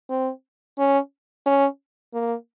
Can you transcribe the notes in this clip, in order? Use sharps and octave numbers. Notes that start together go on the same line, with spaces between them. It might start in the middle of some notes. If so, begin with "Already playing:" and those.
C4
C#4
C#4
A#3